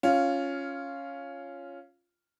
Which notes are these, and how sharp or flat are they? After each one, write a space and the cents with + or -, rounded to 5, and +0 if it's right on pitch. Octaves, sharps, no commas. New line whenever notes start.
C#4 +0 F4 +0